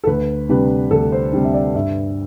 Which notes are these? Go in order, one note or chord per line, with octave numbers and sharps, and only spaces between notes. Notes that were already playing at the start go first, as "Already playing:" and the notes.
A4
D2 B4
C3 G3 D4 B4
D2 A4
C5
C3 G3 D4
E5
D5
G2 E5